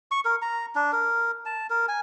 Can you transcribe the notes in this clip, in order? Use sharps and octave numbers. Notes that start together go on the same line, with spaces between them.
C#6
A#4
A#5
D4
A#4
A5
A#4
G#5